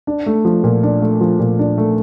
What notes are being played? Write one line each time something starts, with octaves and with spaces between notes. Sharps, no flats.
D4
A3
F3
A#2
D4
A3
F3
A#2
D4
A3